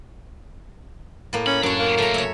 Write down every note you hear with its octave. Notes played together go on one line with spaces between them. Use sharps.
A2 A#3
C#4 B5
F#2 F#3 D4 C#5
A#3
F#2 C#3 A3 A#5
C#5 E5